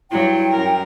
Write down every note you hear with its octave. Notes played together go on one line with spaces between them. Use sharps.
G2 F#3 E4 G5
F#2 A#4